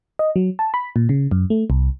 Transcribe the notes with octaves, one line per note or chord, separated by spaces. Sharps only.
D#5
F#3
A5
B5
A#2
C#3
F#2
A3
C2